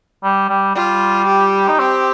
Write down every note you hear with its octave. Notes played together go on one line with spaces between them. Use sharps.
G3
G3
G3 F4
G4
D#4
C4 G4